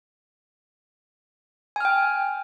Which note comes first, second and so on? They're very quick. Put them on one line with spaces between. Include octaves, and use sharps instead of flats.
G#5 F6 G5